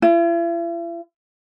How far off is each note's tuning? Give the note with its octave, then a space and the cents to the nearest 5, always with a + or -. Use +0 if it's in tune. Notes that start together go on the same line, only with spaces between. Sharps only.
E4 +45